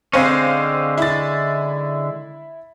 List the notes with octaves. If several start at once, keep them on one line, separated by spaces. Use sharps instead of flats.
D3 G#3 C4 C#4 C5 F5
E4 A6